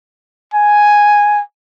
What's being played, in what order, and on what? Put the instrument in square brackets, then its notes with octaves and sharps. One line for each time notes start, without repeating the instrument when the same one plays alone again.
[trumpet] G#5